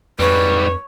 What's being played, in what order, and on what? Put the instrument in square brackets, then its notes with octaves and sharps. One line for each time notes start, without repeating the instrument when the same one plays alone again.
[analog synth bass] F2 [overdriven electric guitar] G#2 G3 [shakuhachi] B4 [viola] C#5